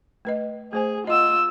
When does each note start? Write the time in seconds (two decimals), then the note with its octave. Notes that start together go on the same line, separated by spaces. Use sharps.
0.25 A3 B4 D#5
0.73 A3 G#4 C5 G#5
1.07 F4 D#5 F#5 E6